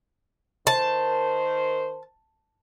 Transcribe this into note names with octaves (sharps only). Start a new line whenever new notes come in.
D#3 A#4 C5 A5